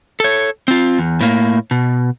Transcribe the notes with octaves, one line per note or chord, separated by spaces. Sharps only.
A4 C#5
C4 F4
E2
A2 A#3
B2